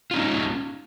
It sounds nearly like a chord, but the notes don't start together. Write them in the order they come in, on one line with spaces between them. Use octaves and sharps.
F4 D#4 C#4